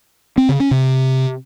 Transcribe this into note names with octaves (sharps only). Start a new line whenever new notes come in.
C4
C#3
C#4
C3